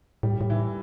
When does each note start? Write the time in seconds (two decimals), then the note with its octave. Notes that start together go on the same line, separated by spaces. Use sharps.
0.23 A2 G3
0.32 G#2
0.41 A2
0.50 E3